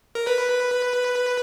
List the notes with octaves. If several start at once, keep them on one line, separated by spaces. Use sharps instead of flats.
A#4
B4